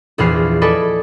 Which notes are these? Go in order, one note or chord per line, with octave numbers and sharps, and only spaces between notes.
A#1 E2 G#4 B4 F6 C7
A4 B4 D5 D#5 G#5